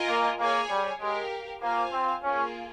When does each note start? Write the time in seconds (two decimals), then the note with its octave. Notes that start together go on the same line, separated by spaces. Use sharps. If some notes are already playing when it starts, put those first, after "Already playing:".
Already playing: F4 A#4 D#5 G#5
0.08 A#3
0.39 A#3 G#4 C#5 G#5
0.69 G3
1.00 G#3 G4 A#4 F5
1.61 A#3 F4 C5 F5 G#5
1.92 C4
2.23 A#3 C#4 F4 G#4